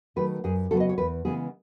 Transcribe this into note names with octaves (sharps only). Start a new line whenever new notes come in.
D#3 F#3 A3 B4
F#2 G#4
C#3 F#3 B3 A4
D#5
C#5
E2 B4
C#3 E3 G#3 B3 G#4